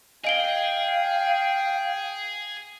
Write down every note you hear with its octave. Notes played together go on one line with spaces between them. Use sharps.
G#4 D#5 F5 G5 D7 G7